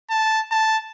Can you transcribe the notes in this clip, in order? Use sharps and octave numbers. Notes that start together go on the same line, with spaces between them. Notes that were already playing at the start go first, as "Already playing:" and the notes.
A5
A5